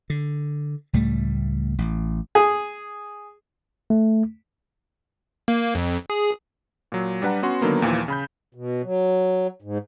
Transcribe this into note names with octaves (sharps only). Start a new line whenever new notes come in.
D3
C#2 A2 G3 A3
A1
G#4
A3
A#3
F2
G#4
A#2 F#3
G3 D4 B4 F#5 A#5
B3 C#4 F#4 C6
D3 D#3 F#3 A#3 B3
D#2 A#2 E3 F3
C#3 B5 G6
B2
F#3
G#2